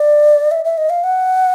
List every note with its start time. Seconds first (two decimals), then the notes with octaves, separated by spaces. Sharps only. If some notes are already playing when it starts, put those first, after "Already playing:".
Already playing: D5
0.51 E5
0.65 E5
0.78 D#5
0.90 F5
1.04 F#5